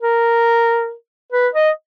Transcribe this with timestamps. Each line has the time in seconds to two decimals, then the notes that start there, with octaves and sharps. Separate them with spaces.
0.01 A#4
1.32 B4
1.54 D#5